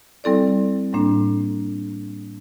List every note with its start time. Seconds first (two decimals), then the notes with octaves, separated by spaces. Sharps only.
0.24 G3 C4 E4 A4 D5
0.93 A2 G3 A#3 D4